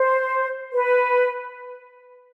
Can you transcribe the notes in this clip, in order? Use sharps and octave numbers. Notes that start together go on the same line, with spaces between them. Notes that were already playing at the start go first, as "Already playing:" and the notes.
Already playing: C5
B4